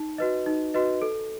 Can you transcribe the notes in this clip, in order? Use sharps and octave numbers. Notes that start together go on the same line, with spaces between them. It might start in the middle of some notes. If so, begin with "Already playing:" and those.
Already playing: D#4
F#4 B4 D#5
D#4
F#4 B4 D#5
A4